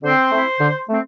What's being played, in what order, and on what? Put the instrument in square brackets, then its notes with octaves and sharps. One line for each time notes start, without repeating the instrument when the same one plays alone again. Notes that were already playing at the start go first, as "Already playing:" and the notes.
[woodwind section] D3 C4 C5
A3 C4 E4
D3
A3 C4